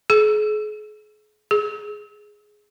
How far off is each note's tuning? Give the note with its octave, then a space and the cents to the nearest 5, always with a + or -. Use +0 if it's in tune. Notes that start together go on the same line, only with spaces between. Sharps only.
G#4 +40
G#4 +5